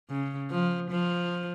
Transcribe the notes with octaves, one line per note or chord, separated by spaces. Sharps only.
C#3
F3
F3